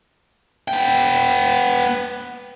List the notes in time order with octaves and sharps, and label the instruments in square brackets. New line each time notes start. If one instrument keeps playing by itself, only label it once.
[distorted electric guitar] B3 G5